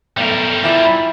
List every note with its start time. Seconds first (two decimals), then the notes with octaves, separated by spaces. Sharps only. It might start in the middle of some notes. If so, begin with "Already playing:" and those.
0.17 B1 A2 G3 A#4
0.64 E3 E4 F4 D5